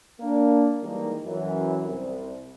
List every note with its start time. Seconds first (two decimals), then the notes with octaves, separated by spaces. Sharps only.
0.21 A#3 D4
0.81 D#3 E3 G3 G#3 A#3 D#4
1.25 F#2 E3
1.85 C2